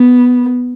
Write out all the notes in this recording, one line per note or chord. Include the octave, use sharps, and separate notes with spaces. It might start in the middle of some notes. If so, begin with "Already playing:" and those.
Already playing: B3